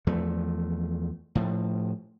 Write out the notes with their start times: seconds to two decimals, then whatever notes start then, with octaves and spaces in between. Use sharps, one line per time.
0.07 E2 F3 A3
1.35 A2 F3